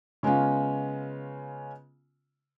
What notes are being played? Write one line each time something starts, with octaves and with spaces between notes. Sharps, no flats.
C#3 G#3 B3 C#4 F4